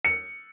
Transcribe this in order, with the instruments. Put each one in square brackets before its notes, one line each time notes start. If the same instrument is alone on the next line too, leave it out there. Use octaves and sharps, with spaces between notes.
[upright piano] C#7